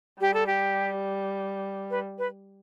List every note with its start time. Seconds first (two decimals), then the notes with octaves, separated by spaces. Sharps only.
0.21 G3 G4
0.34 A4
0.47 G4
1.90 B4
2.18 B4